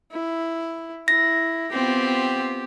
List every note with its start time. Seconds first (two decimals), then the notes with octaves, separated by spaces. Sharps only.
0.11 E4
1.08 E4 A#6
1.72 B3 C4 F4 G4